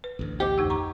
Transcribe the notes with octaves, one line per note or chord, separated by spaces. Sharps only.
B4
A1 D2
G4 C5 D#5 D6
F2 D#4 E6
A#5 C#6